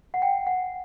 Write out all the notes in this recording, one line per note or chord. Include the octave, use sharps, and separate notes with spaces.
F#5
G5
F#5